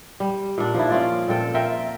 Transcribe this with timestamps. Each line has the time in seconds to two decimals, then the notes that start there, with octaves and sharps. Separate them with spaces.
0.20 G3
0.58 A#2 D4
0.75 F3 D#4 E4
0.90 C#4 F4 D5
1.28 A#2 C4 A4 G5
1.54 F4 A#4 E5 G5